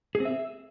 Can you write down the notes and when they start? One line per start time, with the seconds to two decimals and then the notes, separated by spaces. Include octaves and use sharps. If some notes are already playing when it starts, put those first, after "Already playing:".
0.15 G#4
0.20 C4
0.25 E5